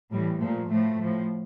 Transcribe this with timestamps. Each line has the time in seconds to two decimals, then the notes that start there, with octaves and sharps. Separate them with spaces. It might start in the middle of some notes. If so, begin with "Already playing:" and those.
0.12 A2 E3 G3
0.40 A#2 F3 A3
0.69 A2 F3 A3
0.98 A2 F3